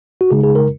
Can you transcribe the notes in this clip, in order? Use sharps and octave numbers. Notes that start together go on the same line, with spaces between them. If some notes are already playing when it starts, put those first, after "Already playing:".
F#4
C#3 G#3 D#4 G#4
G#4
A#4